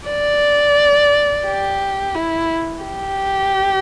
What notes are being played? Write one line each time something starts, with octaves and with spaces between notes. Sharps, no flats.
D5
G4
E4
G4